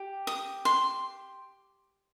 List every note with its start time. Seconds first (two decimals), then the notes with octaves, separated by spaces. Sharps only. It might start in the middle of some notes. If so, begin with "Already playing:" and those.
Already playing: G4
0.27 D#6
0.65 C6